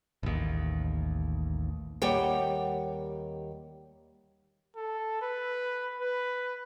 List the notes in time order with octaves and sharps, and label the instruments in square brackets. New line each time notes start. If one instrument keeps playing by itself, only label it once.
[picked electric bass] A1 D#2
[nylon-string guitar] D#2 G3 C#5 F#5 G5
[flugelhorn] A4
B4
B4